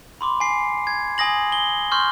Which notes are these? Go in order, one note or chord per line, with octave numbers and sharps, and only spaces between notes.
B5 C6 D6
G#5 C7
G#6
G#5 D#6 A#6 F#7
G7
C6 C#6 F6 G6